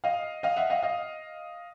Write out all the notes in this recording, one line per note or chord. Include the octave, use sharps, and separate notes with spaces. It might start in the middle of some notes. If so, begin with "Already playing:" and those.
D#5 F5
D#5 F5
E5 F#5
D#5 F5
D#5 F5